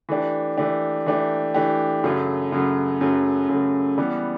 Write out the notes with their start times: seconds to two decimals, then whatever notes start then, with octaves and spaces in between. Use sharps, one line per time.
0.09 E3 A3 D4 G4
0.57 E3 A3 D4 G4
1.06 E3 A3 D4 G4
1.54 E3 A3 D4 G4
2.04 F#2 C#3 F#3 A3
2.52 F#2 C#3 F#3 A3
3.01 F#2 C#3 F#3 A3
3.49 F#2 C#3 F#3 A3
3.98 E3 G3 B3